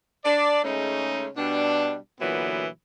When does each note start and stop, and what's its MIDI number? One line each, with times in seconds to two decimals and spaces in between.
0.25 0.61 62
0.25 0.61 74
0.64 1.27 49
0.64 1.27 56
0.64 1.27 57
0.64 1.27 61
0.64 1.27 63
1.37 1.96 47
1.37 1.96 55
1.37 1.96 62
2.20 2.67 46
2.20 2.67 50
2.20 2.67 52
2.20 2.67 54
2.20 2.67 59